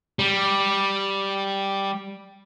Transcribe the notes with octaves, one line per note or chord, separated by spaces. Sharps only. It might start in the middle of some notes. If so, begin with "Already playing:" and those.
G3